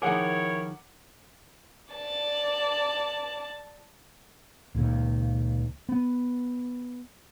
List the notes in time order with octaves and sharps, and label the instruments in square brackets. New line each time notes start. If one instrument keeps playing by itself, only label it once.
[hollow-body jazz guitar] D#3 F3 G#4 [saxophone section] E4 A#4 C#5 [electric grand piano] F#5 D6
[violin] D5 A5
[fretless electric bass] C#2 A#2 D#3
B3